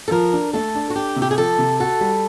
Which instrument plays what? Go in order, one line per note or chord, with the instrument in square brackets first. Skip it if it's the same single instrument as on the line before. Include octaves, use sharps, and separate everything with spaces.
[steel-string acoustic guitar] A4
[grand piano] F3 [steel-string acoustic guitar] A#4
[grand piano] D4
[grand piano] A3 [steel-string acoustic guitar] A4
[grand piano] D4
[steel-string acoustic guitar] F#4
[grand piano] D4 [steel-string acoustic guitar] G4
[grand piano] C3
[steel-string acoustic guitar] G4
G#4
[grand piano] F3 [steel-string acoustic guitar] A4
[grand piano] C3
[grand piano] F#4 [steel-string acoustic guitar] A4
[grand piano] G3